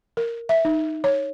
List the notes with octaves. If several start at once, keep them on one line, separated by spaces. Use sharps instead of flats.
A#4
E5
D#4
C#5